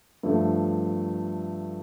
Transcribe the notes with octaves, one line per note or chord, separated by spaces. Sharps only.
G2 F3 A3